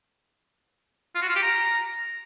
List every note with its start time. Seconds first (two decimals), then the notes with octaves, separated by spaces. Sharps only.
1.15 F4
1.22 F#4
1.29 F4
1.36 G4
1.42 A#5